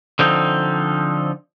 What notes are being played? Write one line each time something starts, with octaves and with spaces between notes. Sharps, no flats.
D3 F3 C4 D#4